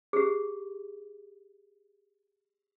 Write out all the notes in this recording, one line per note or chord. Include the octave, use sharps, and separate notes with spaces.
G4 G#4